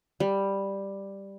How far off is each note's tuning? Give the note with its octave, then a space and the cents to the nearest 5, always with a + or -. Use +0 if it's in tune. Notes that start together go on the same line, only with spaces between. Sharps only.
G3 +5